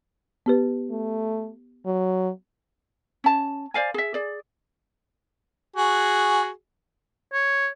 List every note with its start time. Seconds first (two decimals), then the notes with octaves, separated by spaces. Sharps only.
0.46 B3 G4 B4
0.90 A3
1.86 F#3
3.24 C#4 A5
3.74 C5 D5 F5 G#5
3.94 G#4 E5
4.14 G#4 D5
5.76 F#4 G#4
7.33 C#5